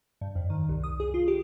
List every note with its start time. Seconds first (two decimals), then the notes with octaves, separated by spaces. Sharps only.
0.21 G2
0.35 F2
0.50 D#3
0.69 C2
0.84 D#6
1.00 G#4
1.14 F4
1.28 G4